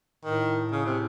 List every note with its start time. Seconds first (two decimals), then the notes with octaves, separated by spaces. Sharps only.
0.24 A2 D#3
0.72 C#3
0.85 C3